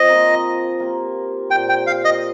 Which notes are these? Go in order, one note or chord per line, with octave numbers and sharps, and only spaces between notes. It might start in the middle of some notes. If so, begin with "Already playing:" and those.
Already playing: F3 C4 C5 D#5
A#3 F4 A#4
A#3 G4 A#4
A#2 A#3 G4 C5 G5
G5
F5
D#5